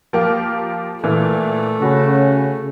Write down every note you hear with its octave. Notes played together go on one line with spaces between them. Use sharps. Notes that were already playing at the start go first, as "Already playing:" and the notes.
F3 A#3 G4
A#2 E3 A3
C#3 C#4 F#4 B5